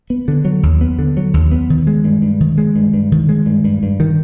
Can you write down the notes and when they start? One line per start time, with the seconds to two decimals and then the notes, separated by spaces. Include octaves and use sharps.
0.10 B3
0.28 D3
0.45 F#3
0.63 D#2
0.81 B3
0.99 D3
1.17 F#3
1.34 D#2
1.51 B3
1.70 D#3
1.87 G#3
2.04 G2
2.22 G2
2.40 D#3
2.58 G#3
2.76 G2
2.94 G2
3.12 D#3
3.29 G#3
3.46 G2
3.64 G2
3.83 G2
4.00 D#3